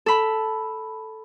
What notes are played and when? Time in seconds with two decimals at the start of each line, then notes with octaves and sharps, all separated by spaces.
0.06 A4 B5